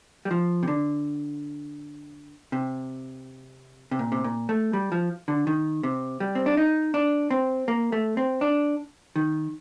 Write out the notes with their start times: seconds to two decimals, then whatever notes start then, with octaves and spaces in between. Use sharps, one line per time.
0.25 G3
0.31 F3
0.63 C3
0.68 D3
2.52 C3
3.91 C3
3.99 A#2
4.12 C3
4.24 A#2
4.49 A3
4.73 G3
4.92 F3
5.28 D3
5.47 D#3
5.83 C3
6.20 G3
6.35 C4
6.46 D4
6.57 D#4
6.94 D4
7.31 C4
7.68 A#3
7.92 A3
8.17 C4
8.41 D4
9.16 D#3